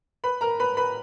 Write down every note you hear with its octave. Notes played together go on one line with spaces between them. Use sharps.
B4 B5
A#4 A#5
B4 B5
B4 B5